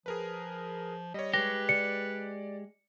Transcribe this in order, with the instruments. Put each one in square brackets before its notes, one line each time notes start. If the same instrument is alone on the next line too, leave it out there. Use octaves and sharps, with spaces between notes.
[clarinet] F3 [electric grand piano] G#4 A#4 B4
[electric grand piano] G3 C#5 [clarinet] D#5
[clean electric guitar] G#3 G4 [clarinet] B4 [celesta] A#6
[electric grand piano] D5 [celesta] C#7